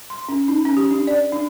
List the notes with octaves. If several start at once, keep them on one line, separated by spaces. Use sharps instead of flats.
C6
C#4
D#4
C#4
G4
D4
D5
D4